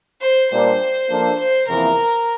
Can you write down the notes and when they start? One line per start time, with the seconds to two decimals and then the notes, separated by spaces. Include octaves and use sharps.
0.21 C5
0.50 A#2 G3 A#3 D4 C5
1.09 F3 A#3 D4 A4
1.39 C5
1.67 E2 C3 F3 A#3 E4 A#4